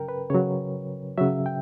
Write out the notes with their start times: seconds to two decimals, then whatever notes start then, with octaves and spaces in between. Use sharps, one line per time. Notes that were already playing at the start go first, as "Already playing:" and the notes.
Already playing: C#3 F#3 A#4 G5
0.09 B4
0.30 C#3 F#3 C#5
1.18 C#3 F#3 E5
1.46 G5